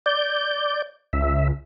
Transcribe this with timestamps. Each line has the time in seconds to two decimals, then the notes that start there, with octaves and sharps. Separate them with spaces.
0.06 D5 G6
1.13 C#2 E5